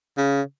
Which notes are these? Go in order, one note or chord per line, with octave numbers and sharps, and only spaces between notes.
C#3